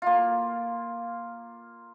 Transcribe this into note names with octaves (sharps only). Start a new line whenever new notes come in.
A#3 F4